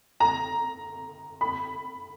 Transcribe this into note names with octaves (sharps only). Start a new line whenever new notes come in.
A#5
B5